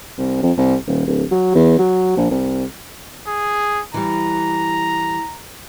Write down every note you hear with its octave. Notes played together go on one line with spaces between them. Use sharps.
C2
F2
C2
D#1
D1
F#3
E2
F#3
A#1
C2
G#4
E3 G3 A#5